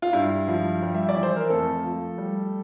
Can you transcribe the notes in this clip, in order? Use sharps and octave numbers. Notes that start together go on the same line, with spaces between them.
F4
G2 E4
F3
G3
E5
D5
E3
C5
A#4
F2 A3 A4
F3
G3